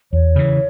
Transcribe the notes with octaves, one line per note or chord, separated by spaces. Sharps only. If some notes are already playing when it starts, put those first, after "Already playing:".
E2 C#5
C#3 E3